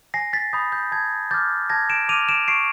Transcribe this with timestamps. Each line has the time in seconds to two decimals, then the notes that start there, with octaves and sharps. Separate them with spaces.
0.14 G#5 A#6 C7
0.33 A6 B6
0.53 B5 D#6 G6
0.72 G6
0.92 A5 G#6
1.31 D6 F6 G6 A6
1.70 A5 G#6 A#6
1.90 D7 E7
2.09 D6 F6 D#7 F7
2.29 D7 E7
2.48 C#6 C7 D7